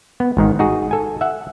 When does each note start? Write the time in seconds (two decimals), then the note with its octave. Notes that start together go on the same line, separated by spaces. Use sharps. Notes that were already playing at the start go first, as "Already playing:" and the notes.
0.20 B3
0.37 G#1 G#2 D#3
0.59 D#4 F#4 G#4
0.91 A4 G#5
1.21 E5 F#5